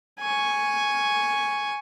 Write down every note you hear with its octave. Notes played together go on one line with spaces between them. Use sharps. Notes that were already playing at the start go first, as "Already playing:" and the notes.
G#5 C#6